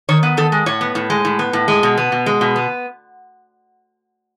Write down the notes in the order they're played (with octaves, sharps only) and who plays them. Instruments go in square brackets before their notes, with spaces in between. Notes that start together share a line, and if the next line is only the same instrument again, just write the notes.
[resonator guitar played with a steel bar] D#3 C#5
B3
D#3 A4
G#3
A2 C#5
B3
A2
G#3
A2
B3
A2
G#3
B2
B3
B2
G#3
B2
B3